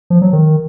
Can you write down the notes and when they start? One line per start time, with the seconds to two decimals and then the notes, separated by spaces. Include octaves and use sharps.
0.10 F3
0.22 F#3
0.33 D#3